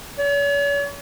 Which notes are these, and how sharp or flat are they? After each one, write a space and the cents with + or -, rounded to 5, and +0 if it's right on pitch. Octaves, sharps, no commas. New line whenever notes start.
C#5 +45